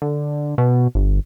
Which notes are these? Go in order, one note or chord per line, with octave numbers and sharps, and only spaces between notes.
D3
B2
G1